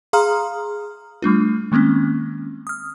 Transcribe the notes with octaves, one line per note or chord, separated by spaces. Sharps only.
G#4 F5 A#5 C6 D#6 F6
G3 A3 D4 F4
D#3 G#3 A#3 C4 C#4
D#6 F6